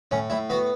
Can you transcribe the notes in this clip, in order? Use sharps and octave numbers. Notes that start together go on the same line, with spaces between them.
A2 C#4
A2 E4
B3 F#4